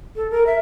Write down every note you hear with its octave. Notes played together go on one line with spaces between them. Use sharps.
A4
A#4
E5